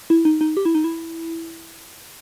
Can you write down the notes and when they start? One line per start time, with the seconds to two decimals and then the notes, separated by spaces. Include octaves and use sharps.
0.10 E4
0.25 D#4
0.41 D#4
0.57 G4
0.65 E4
0.75 D#4
0.84 E4